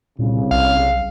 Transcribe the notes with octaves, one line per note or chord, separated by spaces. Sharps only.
C2 A#2 C#3
B1 F5